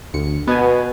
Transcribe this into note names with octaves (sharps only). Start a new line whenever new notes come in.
D2 C#7
B2 B3 G#5